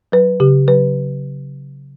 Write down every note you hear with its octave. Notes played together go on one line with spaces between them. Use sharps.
F#3 B4
C#3 G4
F#3 B4